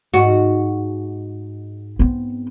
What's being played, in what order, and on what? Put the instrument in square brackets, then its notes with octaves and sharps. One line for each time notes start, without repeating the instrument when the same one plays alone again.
[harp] G#2 [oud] F#4
[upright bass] B3 C4